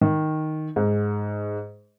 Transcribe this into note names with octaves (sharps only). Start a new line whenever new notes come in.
D#3
G#2